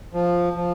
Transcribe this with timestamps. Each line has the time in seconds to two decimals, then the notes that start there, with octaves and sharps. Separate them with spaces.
0.13 F3
0.53 F3